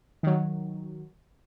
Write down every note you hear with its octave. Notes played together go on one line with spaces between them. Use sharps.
D#3 F#3